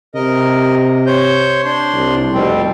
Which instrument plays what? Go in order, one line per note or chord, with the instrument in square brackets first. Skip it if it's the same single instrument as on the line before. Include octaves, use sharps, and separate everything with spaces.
[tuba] C3 [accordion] A#4 D#5
[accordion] C5 C#5 G6
D4 C6
[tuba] C2
[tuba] F1 [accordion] B2 G3 C4